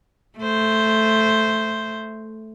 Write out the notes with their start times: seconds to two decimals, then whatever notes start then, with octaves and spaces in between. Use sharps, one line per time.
0.39 A3 C5